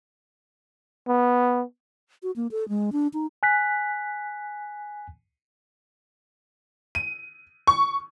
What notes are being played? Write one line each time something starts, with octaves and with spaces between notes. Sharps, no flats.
B3
F#4
A#3
A4
G#3
D4
D#4
G#5 F#6 B6
D#7
C#6